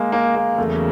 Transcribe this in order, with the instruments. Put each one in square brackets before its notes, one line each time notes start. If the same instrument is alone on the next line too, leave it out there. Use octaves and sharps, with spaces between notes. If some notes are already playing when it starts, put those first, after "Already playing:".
Already playing: [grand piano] G#3 A#3
A#3
A#3
[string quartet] E2 C#3 F#3 A#3 [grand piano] A3